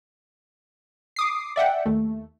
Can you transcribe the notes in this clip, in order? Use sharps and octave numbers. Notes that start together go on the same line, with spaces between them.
D6 D#6 C7
D5 E5 F#5 G5
D#2 A3